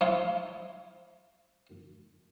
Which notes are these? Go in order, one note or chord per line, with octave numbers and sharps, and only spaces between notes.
F3 E4 F4